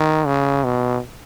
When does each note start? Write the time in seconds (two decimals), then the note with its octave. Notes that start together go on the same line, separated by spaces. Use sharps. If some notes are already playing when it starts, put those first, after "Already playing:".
Already playing: D#3
0.26 C#3
0.64 B2